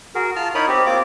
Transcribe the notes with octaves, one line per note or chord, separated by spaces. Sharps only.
F#4 G#4 A#4
F4 A5 F6
D#4 E4 A#4 C#5 B5 D#6
C4 G4
A#3 C4 F4 D6